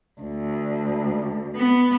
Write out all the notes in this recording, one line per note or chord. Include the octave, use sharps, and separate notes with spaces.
D2
B3